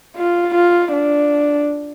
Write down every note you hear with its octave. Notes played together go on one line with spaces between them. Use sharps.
F4
F4
D4